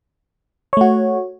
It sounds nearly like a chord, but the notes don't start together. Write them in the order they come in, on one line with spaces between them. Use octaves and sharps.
C#5 A3 F#4